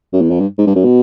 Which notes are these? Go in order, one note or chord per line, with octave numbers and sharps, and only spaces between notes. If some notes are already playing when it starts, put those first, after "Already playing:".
F#2
E2
F2
G2
G#2
G2
F#2
B2